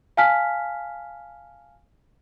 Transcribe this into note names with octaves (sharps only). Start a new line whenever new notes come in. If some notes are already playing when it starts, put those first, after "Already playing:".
F5 G#5 A5 F6 B6